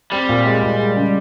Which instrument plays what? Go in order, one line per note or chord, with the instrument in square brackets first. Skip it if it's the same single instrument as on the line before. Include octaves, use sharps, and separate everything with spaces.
[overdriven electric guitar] G3 [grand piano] C4
[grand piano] A#2
G#3
A#2
G#3
C#3